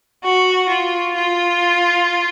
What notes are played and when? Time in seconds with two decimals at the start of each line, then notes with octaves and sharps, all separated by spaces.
0.23 F#4
0.69 F4
1.15 F4